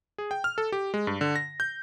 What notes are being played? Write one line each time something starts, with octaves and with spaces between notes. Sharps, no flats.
G#4
G5
F6
A4
G4
G#3
G2
D3
A#6
G6